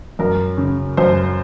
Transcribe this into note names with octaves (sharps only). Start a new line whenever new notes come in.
F#2 A#4
C#3
F#2 C5